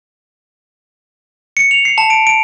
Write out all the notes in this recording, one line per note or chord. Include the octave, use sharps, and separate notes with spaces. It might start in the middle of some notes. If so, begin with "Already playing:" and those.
C#7
F7
C7
A5
D7
D7